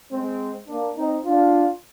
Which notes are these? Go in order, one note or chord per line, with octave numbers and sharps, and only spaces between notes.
G#3 C4
A#3 D4
C4 D#4
D4 F4